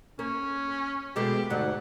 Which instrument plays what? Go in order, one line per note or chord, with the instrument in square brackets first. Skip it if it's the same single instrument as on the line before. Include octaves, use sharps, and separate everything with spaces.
[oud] A#3 [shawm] C#4
[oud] B2 G#3 A3 [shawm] G4
[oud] D2 G#2 F#3 [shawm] F#5